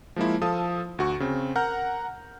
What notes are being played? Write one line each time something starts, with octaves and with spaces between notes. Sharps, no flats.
F3 G#3 A#3 E4
F3 A4 F5 A5 D#6
D2 F#4 C#6
C#3 C4
A#4 F#5 A#5 F6 G6